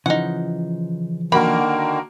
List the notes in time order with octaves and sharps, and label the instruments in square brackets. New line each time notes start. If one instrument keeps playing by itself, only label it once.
[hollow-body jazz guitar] C#3 E3 F3 [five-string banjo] D#4 F#5
[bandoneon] D3 D#3 [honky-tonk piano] A#3 F#4 A#4 [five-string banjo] B5